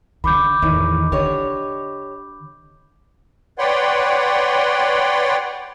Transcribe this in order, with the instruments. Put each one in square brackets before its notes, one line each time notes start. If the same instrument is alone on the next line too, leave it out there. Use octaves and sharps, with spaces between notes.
[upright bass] D3 E3 [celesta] B5 D6 G6
[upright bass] E2 D#3 [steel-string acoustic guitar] A2 D#4
[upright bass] D3 [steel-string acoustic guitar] G4 C#5 D#5
[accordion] B4 C#5 D5 F#5 G5 C6